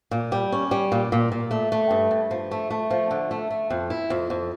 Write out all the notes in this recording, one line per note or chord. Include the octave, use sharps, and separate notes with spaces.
A#2
G3
C#4
G3
A#2
A#2
A#2
A3
A3
G2
G2
F3
A3
A3
F3
D3
A3
A3
F2
E4
F2
F2